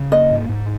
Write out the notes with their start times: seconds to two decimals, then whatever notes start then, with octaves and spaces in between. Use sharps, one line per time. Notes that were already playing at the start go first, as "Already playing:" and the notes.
Already playing: C#3
0.12 A#3 D#5
0.31 G#2
0.49 G#2